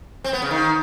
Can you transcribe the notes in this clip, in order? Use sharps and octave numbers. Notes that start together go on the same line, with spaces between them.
C4
B3
C#3
D#3